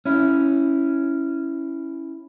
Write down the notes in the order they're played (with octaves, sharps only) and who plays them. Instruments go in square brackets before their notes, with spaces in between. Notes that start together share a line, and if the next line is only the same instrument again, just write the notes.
[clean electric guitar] C#4 E4